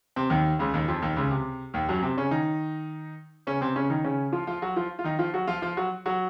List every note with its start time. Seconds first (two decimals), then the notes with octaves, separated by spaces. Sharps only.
0.16 C3 C4
0.30 D#2 D#3
0.59 C#2 C#3
0.74 D#2 D#3
0.88 F2 F3
1.02 D#2 D#3
1.16 C#2 C#3
1.31 C3
1.74 D#2 D#3
1.89 F#2 F#3
2.03 C3 C4
2.17 C#3 C#4
2.31 D#3 D#4
3.47 C#3 C#4
3.61 C3 C4
3.76 C#3 C#4
3.90 D#3 D#4
4.04 C#3 C#4
4.32 F3 F4
4.47 F3 F4
4.62 F#3 F#4
4.76 F3 F4
4.99 F4
5.04 D#3 D#4
5.19 F3 F4
5.34 F#3 F#4
5.47 F3 F4
5.62 F3 F4
5.77 F#3 F#4
6.06 F#3 F#4